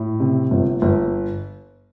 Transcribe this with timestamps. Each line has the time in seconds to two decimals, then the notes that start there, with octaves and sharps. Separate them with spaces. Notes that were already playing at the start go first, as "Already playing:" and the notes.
Already playing: A2
0.20 C3
0.51 G1
0.82 G1